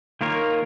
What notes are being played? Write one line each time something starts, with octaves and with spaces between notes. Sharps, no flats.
D#3 A#3 F4 A#4 C#5